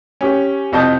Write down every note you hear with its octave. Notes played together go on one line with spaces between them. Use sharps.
C#4 G4
C2 F2 D#5 A5 G6